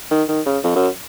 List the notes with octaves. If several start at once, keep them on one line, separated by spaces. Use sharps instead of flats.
D#3
D#3
C#3
F2
F#2